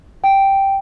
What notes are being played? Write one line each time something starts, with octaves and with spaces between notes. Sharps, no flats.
G5